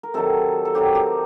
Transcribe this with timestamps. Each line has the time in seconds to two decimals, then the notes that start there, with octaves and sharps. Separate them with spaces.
0.03 A#4
0.14 C3 D#3 F#3 A4
0.65 A4
0.75 C3 D#3 F#3 G4
0.95 G4